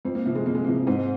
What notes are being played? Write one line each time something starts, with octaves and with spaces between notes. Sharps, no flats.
F2 C4
A#3
C3 F3 A#3
G#3
F2 A#3
G#3
C3 F3 A#3
G#2 C4